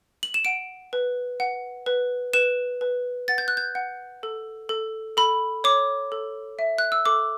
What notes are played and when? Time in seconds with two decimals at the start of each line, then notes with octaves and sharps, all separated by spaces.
0.23 F#7
0.34 E7
0.45 F#5 D7
0.93 B4
1.40 F#5
1.86 B4
2.33 B4 E7
2.81 B4
3.28 F#5 A6
3.38 G6
3.48 F#6
3.57 G6
3.75 F#5
4.23 A4
4.69 A4
5.17 A4 B5
5.64 C#5 D6
6.12 A4
6.59 E5
6.78 F#6
6.92 E6
7.05 A4 D6